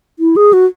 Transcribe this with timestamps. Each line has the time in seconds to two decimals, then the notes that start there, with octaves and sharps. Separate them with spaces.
0.19 E4
0.36 G#4
0.53 F#4